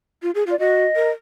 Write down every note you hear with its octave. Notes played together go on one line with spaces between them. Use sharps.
F4
G#4
F4
D5
F#4 D#5
A#4